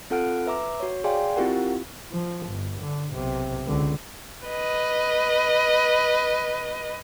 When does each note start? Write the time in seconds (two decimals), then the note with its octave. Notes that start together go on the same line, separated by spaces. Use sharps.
0.10 C4 F4 A4 F#5 F6 D7
0.46 B4 E5 A#5 D6
0.80 F#4 C#5
1.04 G#4 D5 F5 G5 G#5 C6
1.36 C4 E4 F4 G4 A#4 F#5
2.11 F3
2.47 G1
2.80 D3
3.12 B1 C3
3.67 C#2 D3
4.47 B4 D#5